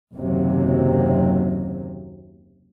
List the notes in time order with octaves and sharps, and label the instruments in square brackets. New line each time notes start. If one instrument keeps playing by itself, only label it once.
[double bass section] F#1 D#2 C3 F#3